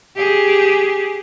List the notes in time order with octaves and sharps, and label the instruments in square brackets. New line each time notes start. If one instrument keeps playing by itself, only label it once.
[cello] G4 G#4